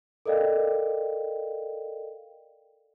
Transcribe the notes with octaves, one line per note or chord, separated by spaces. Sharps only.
A4 A#4 D5 D#5 F5 G5